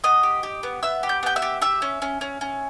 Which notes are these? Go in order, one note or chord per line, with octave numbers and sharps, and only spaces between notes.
B3 D#5 D#6
G4
G4
B3
B3 E5 E6
G4
G6
B3 G5 G6
E5 E6
G4
G4 E5 E6
C#4
C#4
C#4
C#4